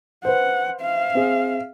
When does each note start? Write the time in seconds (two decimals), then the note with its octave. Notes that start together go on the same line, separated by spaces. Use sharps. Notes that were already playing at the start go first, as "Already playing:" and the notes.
0.25 B4 C5 F#5
0.82 E5 F5
1.15 C4 G#4